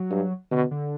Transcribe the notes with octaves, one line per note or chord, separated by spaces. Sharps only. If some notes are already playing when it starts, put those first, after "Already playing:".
Already playing: F#3
G2
B2 D3
D3